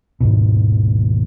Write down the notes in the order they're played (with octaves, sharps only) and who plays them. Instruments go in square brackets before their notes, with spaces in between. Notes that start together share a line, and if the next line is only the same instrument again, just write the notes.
[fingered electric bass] G#1 D#2 G#2 B2